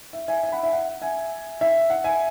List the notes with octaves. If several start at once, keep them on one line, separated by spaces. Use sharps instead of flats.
E5
E5 G#5
E5 G#5
F#5 B5
E5
F#5
E5 G#5
E5
F#5
E5 G#5